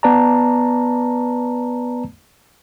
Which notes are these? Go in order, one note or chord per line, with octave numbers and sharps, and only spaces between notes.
B3 B4 D5 A5 A#5